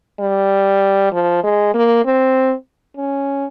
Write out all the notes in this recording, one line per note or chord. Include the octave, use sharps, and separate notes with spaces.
G3
F3
G#3
A#3
C4
C#4